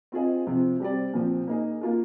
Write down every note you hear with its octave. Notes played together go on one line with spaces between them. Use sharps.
C4 F4 G#4 D#5
C3 F3 C4
G3 C4 G4 D5
A#2 F3 C4
A#3 D#4 G#4
A#3 F4 A#4